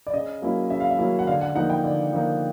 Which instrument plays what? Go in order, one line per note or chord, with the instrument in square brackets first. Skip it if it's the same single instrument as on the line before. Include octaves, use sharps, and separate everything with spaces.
[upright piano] D5
C#3 D#5
F#3 A#3 C#4 E4
C#3 E5
F5
E5
F#3 A#3 C#4 E4
F#5
D3 F5
F#5
F3 A#3 D#4 F#5
G5
D3 D5
F3 A#3 D#4